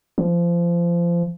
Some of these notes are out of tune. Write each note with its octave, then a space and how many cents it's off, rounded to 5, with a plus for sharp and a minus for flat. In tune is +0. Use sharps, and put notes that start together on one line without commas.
F3 -25